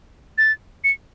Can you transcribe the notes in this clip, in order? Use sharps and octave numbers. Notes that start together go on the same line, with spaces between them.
A6
C#7